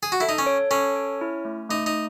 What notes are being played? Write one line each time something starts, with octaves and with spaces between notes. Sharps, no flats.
G#4
F#4
E4 A4
D#4
C#4
C#5
C#4 A4
C#5
E4
A3
A3 D#4
D#4